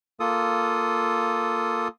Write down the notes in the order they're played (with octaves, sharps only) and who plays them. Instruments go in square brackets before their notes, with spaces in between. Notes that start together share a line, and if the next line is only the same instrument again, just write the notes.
[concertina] A#3 F4 A4 D#6